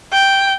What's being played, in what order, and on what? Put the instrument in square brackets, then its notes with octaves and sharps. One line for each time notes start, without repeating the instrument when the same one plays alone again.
[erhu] G5